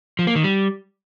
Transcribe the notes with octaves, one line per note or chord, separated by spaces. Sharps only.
F3
A#3
D#3
G3